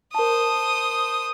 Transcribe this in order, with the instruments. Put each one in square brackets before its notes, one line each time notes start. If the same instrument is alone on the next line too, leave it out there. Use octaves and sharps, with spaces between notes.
[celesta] A#4 A5 [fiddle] C5 D#6